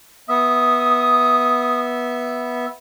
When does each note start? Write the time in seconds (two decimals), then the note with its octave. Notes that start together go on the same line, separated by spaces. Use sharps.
0.29 B3 E5 D#6